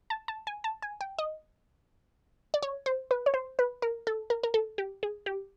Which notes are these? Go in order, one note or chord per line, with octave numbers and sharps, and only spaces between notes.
A5
A5
G#5
A5
G#5
G5
D#5
D5
C#5
C5
B4
C#5
C5
B4
A#4
A4
A#4
A#4
A4
G4
G#4
G4